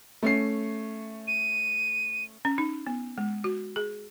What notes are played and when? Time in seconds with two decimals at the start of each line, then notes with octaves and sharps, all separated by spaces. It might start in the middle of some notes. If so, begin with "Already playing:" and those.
0.22 A3 C#4 C7
1.27 D#7
2.45 C#4
2.58 D#4
2.87 B3
3.18 G#3
3.44 F#4
3.76 G#4